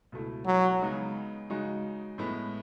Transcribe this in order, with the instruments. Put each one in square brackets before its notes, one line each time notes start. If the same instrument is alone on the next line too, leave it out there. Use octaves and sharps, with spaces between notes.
[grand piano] C#2 B2 A3 E4
[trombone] F#3
[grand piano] C#3 G#3 B3 D#4
C#3 G#3 D#4 F#4
A2 G#3 B3 E4